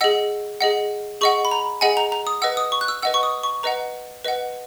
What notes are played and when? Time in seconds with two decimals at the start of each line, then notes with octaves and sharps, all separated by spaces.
0.01 G#4 D#5 F#5 E6
0.61 G#4 D#5 F#5
1.21 G#4 D#5 F#5 C#6
1.45 B5
1.51 A#5
1.81 G#4 D#5 F#5 G#5
1.97 A#5
2.12 A#5
2.27 D#6
2.42 B4 D#5 F#5 E6
2.57 D#6
2.72 C#6
2.81 F#6
2.88 E6
3.03 B4 D#5 F#5 E6
3.14 C#6
3.23 D#6
3.43 C#6
3.63 B4 D#5 F#5 A#5
4.25 B4 D#5 F#5